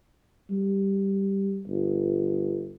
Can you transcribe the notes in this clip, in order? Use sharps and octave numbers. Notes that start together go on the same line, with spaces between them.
G3
G1